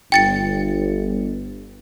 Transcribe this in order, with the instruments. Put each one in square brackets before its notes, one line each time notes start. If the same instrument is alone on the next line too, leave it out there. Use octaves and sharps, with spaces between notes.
[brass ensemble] G1 [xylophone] G5 A6 C#7